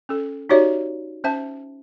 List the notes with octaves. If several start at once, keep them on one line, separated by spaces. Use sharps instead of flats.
C#4 A4
D#4 F#4 G4 C#5 D5 E5
C#4 C5 E5 A5